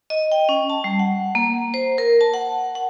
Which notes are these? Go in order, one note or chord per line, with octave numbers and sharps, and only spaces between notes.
D#5
G5
C#4
A5
G3
F#5
A#3
C5
A#4
A5
F#5
F#5